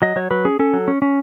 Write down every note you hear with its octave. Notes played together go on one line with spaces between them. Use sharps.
F#3 D#5
F#3 C#5
F#3 B4
C#4 G#4
C#4 A4
F#3
C#4
C#4